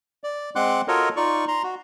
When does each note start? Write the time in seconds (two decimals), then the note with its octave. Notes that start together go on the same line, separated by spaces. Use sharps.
0.24 D5
0.56 G#3 C4 F#5 C6 D6 F#6
0.88 F4 F#4 A4 A#4 C#5 D#5
1.17 D#4 F4 D5 C#6
1.48 A#5 C6
1.63 F#4